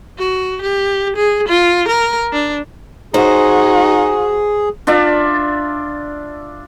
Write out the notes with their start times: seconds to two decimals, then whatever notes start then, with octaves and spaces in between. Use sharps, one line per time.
0.18 F#4
0.62 G4
1.16 G#4
1.48 F4
1.88 A#4
2.33 D4
3.14 D#4 F#4 G#4 C5
4.87 D4 F4 D5 E5